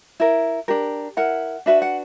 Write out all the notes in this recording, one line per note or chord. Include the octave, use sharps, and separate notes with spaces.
E4 A#4
D4 G4 A#4
E4 A#4 F#5
D4 F#4 B4 E5
F#5